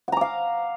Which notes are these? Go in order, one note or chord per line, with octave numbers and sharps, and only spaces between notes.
F5 F#5 A#5 D6